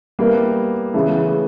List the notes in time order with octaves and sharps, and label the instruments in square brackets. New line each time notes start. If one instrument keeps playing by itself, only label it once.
[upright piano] G3 B3 E4 G4 [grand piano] A#3
[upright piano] C#3 E3 G#3 B3 [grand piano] A3